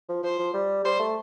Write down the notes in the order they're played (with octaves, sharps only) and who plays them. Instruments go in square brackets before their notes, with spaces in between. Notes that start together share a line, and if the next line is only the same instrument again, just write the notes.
[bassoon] F3
[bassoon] F3 [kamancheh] C5
[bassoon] F3
G3
[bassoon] G3 [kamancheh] C5
[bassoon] A3